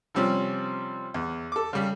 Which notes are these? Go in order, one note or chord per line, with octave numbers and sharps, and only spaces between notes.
C3 F3 G3 C4 C#4
E2
A4 D6
C#3 G3